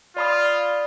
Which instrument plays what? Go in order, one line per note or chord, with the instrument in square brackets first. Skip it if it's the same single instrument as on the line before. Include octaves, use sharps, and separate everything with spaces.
[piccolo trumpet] F4 [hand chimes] D5 B5 D#6